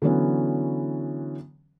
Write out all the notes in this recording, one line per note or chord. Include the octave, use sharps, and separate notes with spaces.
D3 E3 F#3 B3 C#4